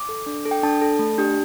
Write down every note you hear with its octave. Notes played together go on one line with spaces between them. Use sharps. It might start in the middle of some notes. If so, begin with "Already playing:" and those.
Already playing: D6
A4
D4
A4
G5
D4 A5
A4
A3
D4 G4